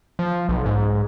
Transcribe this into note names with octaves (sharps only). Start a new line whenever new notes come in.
F3
B1
G#2